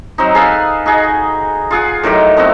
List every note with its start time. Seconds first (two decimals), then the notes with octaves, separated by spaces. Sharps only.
0.18 F#3 C4 D#4
0.35 G#4 A4 B4 F5
0.86 D#4 F#4 G#4
1.71 F4 G#4 F#5
2.03 A2 D#3 F#3 G4
2.37 A3 B3 C4 F#4